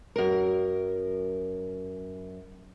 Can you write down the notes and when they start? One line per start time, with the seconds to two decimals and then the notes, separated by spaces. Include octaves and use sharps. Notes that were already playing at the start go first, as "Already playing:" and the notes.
0.16 F#2 A#4